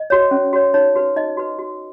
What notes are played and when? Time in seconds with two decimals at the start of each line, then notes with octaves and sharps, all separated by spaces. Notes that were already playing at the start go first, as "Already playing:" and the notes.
Already playing: D#5
0.10 F#4 C#5
0.31 C#4
0.53 F#4 C#5
0.74 D#4 C#5
0.95 F#4 B4
1.16 D#4 D#5
1.37 F#4 B4
1.59 F#4